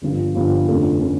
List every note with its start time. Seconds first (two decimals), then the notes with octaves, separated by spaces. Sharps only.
0.02 G1 G2 F3
0.34 G1 G2 F3
0.67 F1 F2 D3 A3 C#4
0.99 D3 A3 C#4